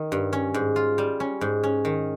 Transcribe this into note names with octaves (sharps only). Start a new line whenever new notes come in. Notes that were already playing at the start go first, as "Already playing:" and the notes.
Already playing: D#3
G2
C#4
G#2
F4
G3
C#4
G#2
C#4
D#3